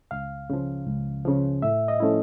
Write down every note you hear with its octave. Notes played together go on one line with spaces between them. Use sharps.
C#2 F5
C#3 F3
C#2
C#3 F3
A2 E5
D#5
F3 A3 C#4 E4